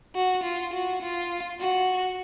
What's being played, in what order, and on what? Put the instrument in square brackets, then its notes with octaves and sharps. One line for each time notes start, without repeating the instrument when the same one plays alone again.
[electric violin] F#4
F4
F#4
F4
F#4